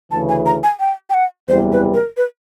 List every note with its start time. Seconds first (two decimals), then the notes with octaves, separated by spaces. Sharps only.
0.11 D2 C#3 E3 A5
0.29 G#5
0.46 A#5
0.63 G#5
0.80 G5
1.10 G5
1.14 F#5
1.49 F#1 E2 C3 E3 G3 C5
1.72 B4
1.94 A#4
2.17 B4